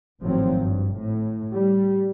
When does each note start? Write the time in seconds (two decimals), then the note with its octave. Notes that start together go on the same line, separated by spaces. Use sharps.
0.22 G#1 A2 F3 F#3 C4
0.58 G2
0.95 A2
1.52 G3